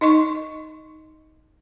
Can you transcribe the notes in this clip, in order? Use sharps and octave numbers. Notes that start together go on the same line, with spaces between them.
D#4 D#5 C6 C#6